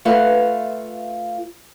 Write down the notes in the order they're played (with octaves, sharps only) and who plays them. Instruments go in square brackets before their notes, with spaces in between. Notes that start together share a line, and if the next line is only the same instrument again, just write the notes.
[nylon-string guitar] A3 F4 B4 E5 F#5